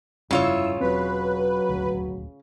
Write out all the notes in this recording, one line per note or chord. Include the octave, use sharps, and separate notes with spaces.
F1 G2 C#3 E4 F4 C#5 E6
E1 F#3 C4 B4
D#1 G#1 D2